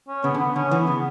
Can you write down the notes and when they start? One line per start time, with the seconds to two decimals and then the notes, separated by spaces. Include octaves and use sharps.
0.08 C#4
0.24 C#3 B3
0.35 D3
0.40 B3
0.56 D3 C#4
0.71 E3 B3
0.87 C#3 B3